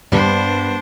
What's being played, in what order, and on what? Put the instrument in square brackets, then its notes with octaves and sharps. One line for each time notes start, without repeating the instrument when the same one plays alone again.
[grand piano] G2 [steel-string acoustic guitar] G3 A#3 B3 [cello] D4 C5